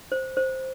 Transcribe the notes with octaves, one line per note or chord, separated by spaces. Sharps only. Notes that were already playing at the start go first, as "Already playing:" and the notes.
C5
C5